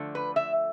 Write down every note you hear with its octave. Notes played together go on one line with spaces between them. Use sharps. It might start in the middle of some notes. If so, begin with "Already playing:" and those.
Already playing: D3 F3 A3
B4
E5